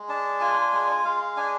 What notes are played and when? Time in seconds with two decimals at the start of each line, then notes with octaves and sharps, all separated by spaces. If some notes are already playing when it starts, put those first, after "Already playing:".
Already playing: G#3
0.09 D4 A5
0.40 F4 G#5
0.72 G#3 G#5
1.05 G#3 F5
1.37 D4 G#5